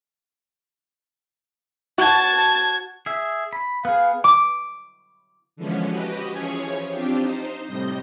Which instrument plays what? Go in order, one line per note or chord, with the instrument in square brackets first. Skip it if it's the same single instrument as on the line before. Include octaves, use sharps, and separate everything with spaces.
[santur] F#4 [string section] A5 [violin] G#6
[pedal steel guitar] G#4 E5
B5
[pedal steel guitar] B3 G#4 [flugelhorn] F5
[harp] D6
[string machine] D3 E3 F3 G#3 B3 C#4
F#4 G4 B4 D#5
E3 F3 C#4 G#4 C#5 G#6
C4 D4 F4 G4
D#4 C5
A2 C3 G3 D#5 D#6 G6